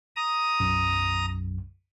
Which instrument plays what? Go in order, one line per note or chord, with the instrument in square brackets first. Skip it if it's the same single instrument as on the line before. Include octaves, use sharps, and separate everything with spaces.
[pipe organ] A#5 D#6
[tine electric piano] B1 F#2